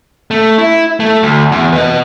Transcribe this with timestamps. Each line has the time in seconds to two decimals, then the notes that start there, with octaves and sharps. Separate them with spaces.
0.31 A3
0.58 E4
1.00 A3
1.23 D2
1.52 E2
1.73 B4 D#5